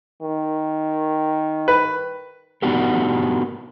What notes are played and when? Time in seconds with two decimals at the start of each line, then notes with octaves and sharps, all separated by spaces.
0.22 D#3
1.68 B4
2.62 B3 D4 D#4 F#4 G4 A#4